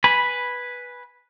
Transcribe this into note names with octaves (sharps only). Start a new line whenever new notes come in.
B4 G#5 B5